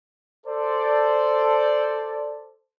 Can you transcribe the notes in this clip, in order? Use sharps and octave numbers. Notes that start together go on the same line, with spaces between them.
A4 C5 D5